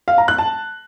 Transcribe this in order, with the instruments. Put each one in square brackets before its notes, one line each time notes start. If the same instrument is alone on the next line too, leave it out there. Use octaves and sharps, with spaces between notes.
[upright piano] F5
A#5
F#6
A5